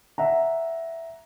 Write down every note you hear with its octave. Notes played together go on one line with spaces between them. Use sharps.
E5 F#5 A#5